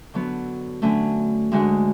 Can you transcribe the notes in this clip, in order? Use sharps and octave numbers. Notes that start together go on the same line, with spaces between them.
D3 F#3 B3
D3 F#3 A3 C#4
D2 D3 G#3 D4 F#4